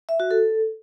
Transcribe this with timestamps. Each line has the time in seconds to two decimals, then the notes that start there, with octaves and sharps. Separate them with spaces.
0.09 E5
0.20 F#4
0.31 A4